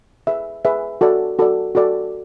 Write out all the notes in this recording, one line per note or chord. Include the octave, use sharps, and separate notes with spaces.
G#4 B4 E5
G#4 B4 E5
F#4 A4 D5
F#4 A4 D5
F#4 A4 D5